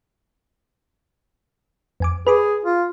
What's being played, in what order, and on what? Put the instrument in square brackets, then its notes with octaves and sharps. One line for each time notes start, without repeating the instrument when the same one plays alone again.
[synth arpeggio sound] F2 G#5 D6
[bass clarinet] G#4 [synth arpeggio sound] B4 B5 D6
[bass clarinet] F4